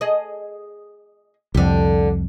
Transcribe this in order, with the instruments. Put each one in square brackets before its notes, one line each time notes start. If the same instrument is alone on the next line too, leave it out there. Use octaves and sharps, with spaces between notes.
[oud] G#4 D#5
[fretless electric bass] C2 F2 [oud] D3 G4